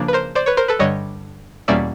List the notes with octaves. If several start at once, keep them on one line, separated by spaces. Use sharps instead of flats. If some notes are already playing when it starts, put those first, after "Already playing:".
Already playing: C#3 F3 A#3 D4
B4
A#4 C5
C5 D5
B4 C#5
A#4 C5
A4 B4
G2 D3 G3 C#5 D#5
E2 B2 G3 A#3 C#4 D5 E5